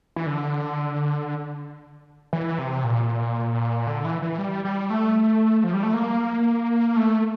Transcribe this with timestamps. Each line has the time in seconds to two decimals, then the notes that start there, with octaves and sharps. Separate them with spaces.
0.16 E3
0.26 D3
2.33 E3
2.59 C3
2.84 A#2
3.87 D3
4.05 E3
4.22 E3
4.38 G3
4.65 G3
4.90 A3
5.64 F3
5.73 G3
5.83 A3
5.94 A#3
6.96 A3